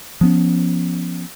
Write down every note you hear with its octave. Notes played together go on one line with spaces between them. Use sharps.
F3 B3 C#4